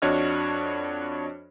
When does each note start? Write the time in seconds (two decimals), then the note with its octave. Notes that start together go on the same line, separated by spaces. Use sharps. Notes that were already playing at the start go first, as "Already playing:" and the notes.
0.02 F2 D4 F#4 C#5 D#5 F6